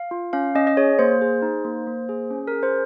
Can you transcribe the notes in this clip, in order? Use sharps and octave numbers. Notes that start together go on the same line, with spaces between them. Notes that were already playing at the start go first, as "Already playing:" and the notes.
Already playing: F5
F4
C#4 F5
C#4 D#5
D#5
G#4 C#5
A#3 C5
G#4
D#4
A#3
A#3
G#4
C#4
G#4 A#4
C5